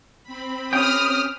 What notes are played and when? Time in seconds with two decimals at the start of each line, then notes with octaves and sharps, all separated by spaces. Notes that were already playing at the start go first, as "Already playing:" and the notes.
0.24 C4 B5
0.73 C#4 G4 G5 D#6 F6